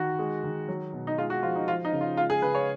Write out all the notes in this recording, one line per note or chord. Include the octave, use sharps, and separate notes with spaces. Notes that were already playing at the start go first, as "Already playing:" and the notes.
Already playing: D#3 F#4
G#3
D#3
F#3
B2
D#4
G#3 F4
F#4
F3 F4
D#4
F3 F4
D#4
C#3
F4
G#3 F4
G#4
C#3 B4
C#5